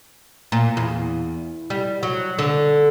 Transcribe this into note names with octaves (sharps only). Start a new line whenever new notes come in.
A#2
E2
G3
F#3
D3